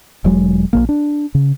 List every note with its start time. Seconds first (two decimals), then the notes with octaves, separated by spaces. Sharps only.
0.25 E1 F#3 G#3
0.73 A#1 F#2 A#3
0.89 D4
1.35 C#3